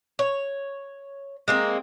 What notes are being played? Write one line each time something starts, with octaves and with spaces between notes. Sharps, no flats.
C#5
G#3 A#3 C4